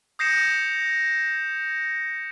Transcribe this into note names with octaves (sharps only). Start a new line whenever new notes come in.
D#6 G6 A#6 C7 C#7 E7